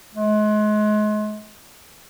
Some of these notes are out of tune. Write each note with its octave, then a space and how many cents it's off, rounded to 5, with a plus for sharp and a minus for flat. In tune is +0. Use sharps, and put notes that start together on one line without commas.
G#3 +35